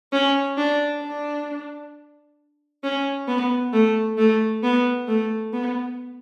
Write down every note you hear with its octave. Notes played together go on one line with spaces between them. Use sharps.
C#4
D4
D4
C#4
B3
A3
A3
B3
A3
B3